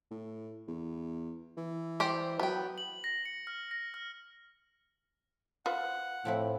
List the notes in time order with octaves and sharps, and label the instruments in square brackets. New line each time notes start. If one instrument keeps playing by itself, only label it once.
[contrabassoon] A2
E2
E3
[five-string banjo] G4 C5 D5
[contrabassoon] F#3 [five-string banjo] B3 G5
[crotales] F#7
A#6
C#7
F6
A#6
F6
[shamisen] F4 B4 C5 [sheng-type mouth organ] F#5
[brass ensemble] A2 [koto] F3 C4 E4